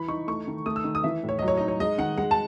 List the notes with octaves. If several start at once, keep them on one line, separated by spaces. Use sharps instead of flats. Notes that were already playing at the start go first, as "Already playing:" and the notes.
Already playing: E3 B5
D#4 C#6
A3 C#6
D#3
A3 D#6
E6
D#3
D#6
E3 E5
A2
C#5
F#3 D#5
C#5
D#4 D#5
C#5
G#3 D#5
D#3 F#5
G#3 F#5
A5